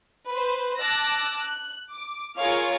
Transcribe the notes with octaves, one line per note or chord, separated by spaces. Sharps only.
B4 C5
A5 D6 E6 F#6 A#6
F#6
D6
F4 G#4 A#4 C#5 F5